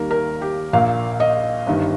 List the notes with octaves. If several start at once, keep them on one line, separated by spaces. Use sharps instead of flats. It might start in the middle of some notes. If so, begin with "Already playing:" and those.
Already playing: D#2 D#3 G3 A#3 A#4
A#4
G4
A#1 A#2 A#3 F5
D#5
G1 G2 D#3